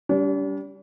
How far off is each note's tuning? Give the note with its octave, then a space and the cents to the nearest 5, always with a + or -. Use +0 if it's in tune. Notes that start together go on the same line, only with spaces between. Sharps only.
G3 -5 D4 -45